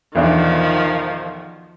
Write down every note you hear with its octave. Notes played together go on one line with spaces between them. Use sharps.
B1 E2 D#3 F3 D4